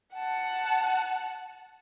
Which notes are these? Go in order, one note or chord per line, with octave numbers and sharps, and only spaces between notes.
F#5 A5